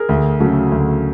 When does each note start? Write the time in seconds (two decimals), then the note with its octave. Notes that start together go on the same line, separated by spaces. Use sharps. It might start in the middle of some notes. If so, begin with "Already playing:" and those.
Already playing: G#4 A#4
0.09 D2
0.40 C#3 F#3 A3
0.72 D2